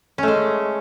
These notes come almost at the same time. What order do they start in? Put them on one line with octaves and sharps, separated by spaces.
C#4 A3 G#3